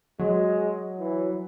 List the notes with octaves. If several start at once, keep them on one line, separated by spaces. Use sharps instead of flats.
F#3 G#3
E3